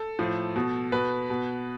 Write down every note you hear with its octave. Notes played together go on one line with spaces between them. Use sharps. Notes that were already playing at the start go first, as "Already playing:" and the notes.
Already playing: A4
A2 F3
B2
B2 B4
B2